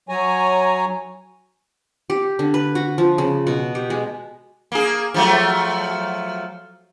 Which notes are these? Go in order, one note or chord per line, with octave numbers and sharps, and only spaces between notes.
F#3 C#5 G#5 A#5
G4
D3
B4
F#4
F3
C#3
B2
G4
G#3
A#3 G#4
F3 F#3 A3